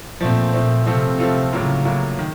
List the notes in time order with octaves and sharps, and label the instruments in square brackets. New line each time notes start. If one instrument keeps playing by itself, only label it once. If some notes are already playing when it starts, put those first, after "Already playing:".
[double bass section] A#2 [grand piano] F3 A3 C4
[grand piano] F3 A3 C4
[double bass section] C3 [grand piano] F3 A3 C4 F4 A4
[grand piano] F3 A3 C4 F4 A4
[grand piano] A2 F#3 A#3 F4 [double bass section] C#3
[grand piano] A2 F#3 A#3 F4
D#3